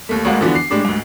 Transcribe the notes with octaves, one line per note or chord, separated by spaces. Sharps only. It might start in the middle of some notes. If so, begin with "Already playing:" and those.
D#2 A3
G#1 D2 G#3 A#3 F#5
D3 E3 F3 B3 D4 F#4
C7
A2 G#3 D4 G4
D2 G#2